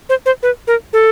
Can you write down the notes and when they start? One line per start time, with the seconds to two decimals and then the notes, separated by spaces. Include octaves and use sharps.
0.09 C5
0.26 C5
0.43 B4
0.67 A#4
0.93 A4